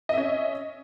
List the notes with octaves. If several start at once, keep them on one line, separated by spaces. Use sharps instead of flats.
C#4 D#5 E5